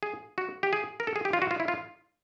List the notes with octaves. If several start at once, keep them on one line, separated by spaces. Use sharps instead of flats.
G#4
F#4
G4
G#4
A#4
A4
G#4
G4
F4
F#4
F4
E4
F4